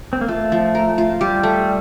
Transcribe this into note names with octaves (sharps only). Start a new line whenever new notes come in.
C4
A#3
A3 F4
F3
A#4
F4
G3 G4
A3